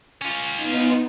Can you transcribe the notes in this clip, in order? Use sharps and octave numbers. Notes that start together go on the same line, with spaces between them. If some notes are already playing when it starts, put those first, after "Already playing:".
C#4 F4
B3 D#4